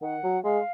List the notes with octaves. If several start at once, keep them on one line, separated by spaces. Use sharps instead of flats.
D#3 F#5
F#3
G#3 F5